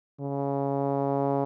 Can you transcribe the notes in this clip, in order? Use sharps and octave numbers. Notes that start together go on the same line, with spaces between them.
C#3